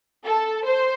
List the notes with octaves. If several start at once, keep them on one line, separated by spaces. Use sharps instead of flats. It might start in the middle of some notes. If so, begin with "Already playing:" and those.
A4
C5